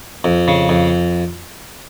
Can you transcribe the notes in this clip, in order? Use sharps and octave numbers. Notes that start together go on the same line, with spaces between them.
F2
C#3
F2